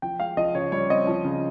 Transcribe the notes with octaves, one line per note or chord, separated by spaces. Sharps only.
F3 G5
G#3 F5
F3 D#5
C#3 C#5
G3 C#5
C4 D#5
F3
C#3